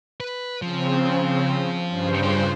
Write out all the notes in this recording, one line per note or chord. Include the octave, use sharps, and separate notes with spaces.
B4
C#3 F3 C4
G2 C#3 C5
F4 G5